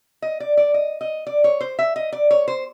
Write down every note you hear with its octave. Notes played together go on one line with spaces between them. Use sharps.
D#5
D5
D5
D#5
D#5
D5
C#5
C5
E5
D#5
D5
C#5
C5